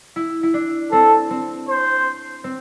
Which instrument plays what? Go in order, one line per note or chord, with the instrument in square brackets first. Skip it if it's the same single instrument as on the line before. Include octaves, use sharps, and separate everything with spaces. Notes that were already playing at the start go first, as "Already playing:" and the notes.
[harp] E4
E4
D4
[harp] C4 [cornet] A4
[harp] C4
[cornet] C5
[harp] C4